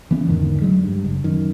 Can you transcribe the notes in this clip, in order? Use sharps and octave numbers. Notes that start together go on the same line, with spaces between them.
E3 B3 C#4
E2 G#2 D3 D#3
F#3 G#3
G2
F#1
F#2 D#3